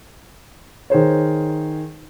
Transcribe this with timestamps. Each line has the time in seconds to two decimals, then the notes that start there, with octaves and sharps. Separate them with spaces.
0.90 D#3 G#4 C5 C#5